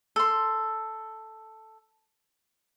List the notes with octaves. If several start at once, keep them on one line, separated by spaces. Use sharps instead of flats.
A4 C6